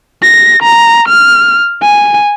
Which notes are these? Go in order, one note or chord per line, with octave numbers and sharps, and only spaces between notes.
A#6
A#5
F6
G#5